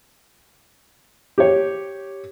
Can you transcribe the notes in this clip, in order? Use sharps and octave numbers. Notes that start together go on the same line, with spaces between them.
G4 C#5